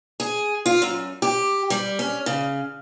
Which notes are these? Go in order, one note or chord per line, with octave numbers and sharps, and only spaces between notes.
G#4
F4
F#2
G4
G3
C#4
C#3